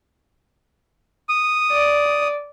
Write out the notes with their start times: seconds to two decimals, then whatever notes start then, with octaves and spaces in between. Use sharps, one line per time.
1.29 D#6
1.72 D5